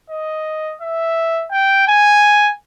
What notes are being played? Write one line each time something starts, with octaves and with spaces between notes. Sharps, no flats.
D#5
E5
G5
G#5